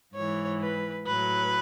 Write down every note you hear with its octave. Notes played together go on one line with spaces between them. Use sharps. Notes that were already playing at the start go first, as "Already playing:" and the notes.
G#2 E3 C#5
B4
A2 F#3 B4